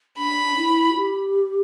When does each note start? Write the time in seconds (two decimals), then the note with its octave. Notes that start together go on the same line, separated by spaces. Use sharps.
0.17 D4 B5
0.57 E4
0.90 F#4
0.95 G4